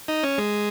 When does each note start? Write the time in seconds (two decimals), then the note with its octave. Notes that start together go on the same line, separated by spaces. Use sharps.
0.08 D#4
0.23 C#4
0.38 G#3